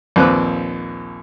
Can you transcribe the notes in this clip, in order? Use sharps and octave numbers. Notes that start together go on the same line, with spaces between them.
A#1 D#2 C4 B4 D6 F#6